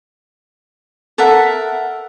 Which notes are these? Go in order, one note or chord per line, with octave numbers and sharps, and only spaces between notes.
A4 A#4 E5 F#5